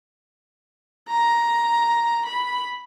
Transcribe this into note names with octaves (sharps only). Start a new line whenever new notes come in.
A#5
B5